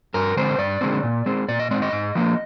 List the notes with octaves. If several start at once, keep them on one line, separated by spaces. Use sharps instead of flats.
G2 A#4
D3 G#3 C4 C5
G2 D5
D3 G#3 C4
A#2
G#3 C4
A#2 D5
D#5
G#3 C4 D5
D#5
G#2
F3 A#3